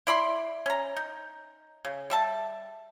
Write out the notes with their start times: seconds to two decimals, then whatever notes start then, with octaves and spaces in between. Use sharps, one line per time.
0.07 E4 D5 B5 C6
0.66 C#4 A#5
0.96 D#4
1.85 C#3
2.10 G3 E5 A5